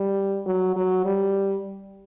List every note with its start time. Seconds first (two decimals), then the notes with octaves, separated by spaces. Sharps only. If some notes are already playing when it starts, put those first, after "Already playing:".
Already playing: G3
0.46 F#3
0.76 F#3
1.06 G3